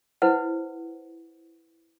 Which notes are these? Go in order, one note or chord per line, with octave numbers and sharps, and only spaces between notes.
E4 B4 C5 F#5